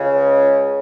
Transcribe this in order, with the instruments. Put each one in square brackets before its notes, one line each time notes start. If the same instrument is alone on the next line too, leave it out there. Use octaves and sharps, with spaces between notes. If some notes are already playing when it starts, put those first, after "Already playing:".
Already playing: [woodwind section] C#2 C#3